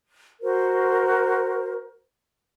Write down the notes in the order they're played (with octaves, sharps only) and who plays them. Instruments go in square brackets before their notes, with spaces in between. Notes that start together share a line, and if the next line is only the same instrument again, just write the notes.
[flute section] F#4 A#4 C5